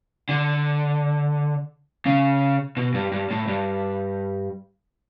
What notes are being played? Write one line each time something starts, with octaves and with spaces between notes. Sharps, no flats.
D3
C#3
B2
G2
G2
A2
G2